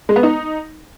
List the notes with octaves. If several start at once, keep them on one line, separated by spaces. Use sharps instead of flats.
G#3
B3
D#4